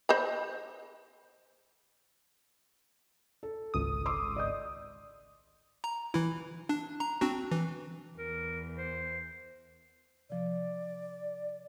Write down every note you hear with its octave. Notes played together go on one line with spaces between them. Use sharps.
C5 D#5 B5
A4
G#1 C#2 D#6
C6 D6 E6
D5 D#5 G6
A#5
E3 E4
D4
A#5
C4 D4 F#4
E3
E2 A#4
C5
C3 F3 D5